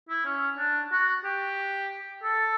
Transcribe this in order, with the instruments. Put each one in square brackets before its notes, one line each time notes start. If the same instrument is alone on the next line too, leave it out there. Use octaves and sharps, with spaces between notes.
[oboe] E4
C#4
D4
F#4
G4
A4